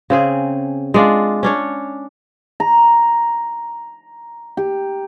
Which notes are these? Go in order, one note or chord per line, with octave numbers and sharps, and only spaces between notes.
C#3 C4 G#4
G#3 D4 F4
C#4 D4 C#5
A#5
G4